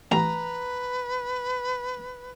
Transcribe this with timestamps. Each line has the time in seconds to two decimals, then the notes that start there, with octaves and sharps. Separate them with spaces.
0.11 A1 B4 A#5